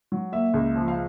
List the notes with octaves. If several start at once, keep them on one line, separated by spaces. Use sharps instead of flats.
F#3
A#3 E5
C#2
F3
F5